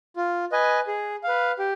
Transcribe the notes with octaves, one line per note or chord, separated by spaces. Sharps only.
F4
B4 D#5 G#5
G#4
B4 F5
G4